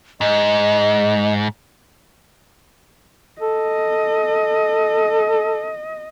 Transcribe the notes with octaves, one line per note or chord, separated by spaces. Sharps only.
G#2 D#5
A4 D#5